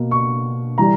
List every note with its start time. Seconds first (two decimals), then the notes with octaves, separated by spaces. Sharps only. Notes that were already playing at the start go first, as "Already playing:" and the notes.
Already playing: B2 A#3
0.11 C#6
0.78 E3 G3 A#5